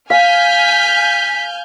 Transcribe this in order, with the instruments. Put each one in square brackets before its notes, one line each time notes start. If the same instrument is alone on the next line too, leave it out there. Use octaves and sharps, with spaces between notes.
[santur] F5 [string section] G#5 F6 G6 [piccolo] B6